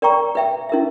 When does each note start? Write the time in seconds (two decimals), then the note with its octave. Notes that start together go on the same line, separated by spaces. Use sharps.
0.02 A#4 D5 G5 A#5 C#6
0.35 B4 E5 G5
0.69 C#4 E4 A#4 E5